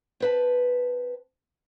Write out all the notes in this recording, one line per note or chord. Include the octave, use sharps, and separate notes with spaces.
C4 B4 A5